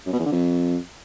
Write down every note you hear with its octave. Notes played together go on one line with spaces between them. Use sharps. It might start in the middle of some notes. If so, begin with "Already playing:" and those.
F#2
B2
E2
D3
F2